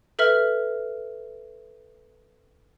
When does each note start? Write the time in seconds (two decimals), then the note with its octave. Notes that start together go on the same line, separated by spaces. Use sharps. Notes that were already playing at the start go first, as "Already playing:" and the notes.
0.19 A4 B4 E5 F6